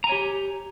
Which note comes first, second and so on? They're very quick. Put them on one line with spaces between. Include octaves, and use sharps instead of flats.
A#5 G#5 C#5 G4